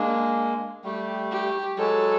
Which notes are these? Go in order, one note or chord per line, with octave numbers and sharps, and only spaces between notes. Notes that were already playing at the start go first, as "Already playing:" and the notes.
Already playing: G#3 A#3 D4
G3 A3 G4
G4
F#3 G#3 A4